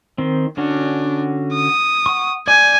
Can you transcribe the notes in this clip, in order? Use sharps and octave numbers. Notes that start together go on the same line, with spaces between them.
D#3 C4
D3 C#4 D4 F#4
D#6
F#5 C#6
D5 G#5 G6